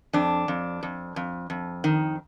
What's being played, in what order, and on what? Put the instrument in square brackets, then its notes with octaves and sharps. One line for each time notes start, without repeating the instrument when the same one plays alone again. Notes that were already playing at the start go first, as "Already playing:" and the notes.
[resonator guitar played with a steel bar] F2 D4
F2
F2
F2
F2
D#3